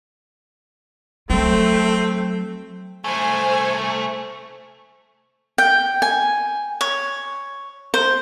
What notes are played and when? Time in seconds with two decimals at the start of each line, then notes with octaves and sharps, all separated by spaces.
1.30 F#3 A3 C4
3.04 C2 A3 C5 G#5
5.58 G5
6.02 G#5
6.81 C#5
7.94 C5